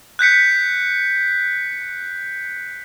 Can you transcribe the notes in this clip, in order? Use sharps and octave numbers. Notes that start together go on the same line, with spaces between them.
F#6 G6 B6 C#7